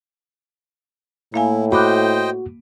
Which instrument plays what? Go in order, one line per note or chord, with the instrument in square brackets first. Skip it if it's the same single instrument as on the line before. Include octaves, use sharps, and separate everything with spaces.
[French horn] A2 [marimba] A#3 F5 G#5 [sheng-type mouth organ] E4
[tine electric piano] F#4 [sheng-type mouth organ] C5 D#5 G5 [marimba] B5 D6 F#6